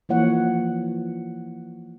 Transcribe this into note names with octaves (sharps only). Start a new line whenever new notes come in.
E3 F3 A#3 C#5 F#5